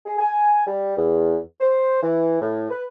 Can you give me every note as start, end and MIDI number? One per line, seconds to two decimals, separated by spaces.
0.06 0.15 68
0.19 0.62 80
0.67 0.95 55
0.97 1.37 40
1.61 2.00 72
2.02 2.38 52
2.41 2.68 45
2.70 2.83 71